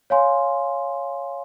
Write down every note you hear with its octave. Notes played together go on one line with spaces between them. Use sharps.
C#5 F5 G#5 C6